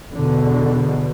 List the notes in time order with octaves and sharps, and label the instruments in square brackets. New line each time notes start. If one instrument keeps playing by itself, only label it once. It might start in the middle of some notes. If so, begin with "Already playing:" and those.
[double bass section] E2 B2 D3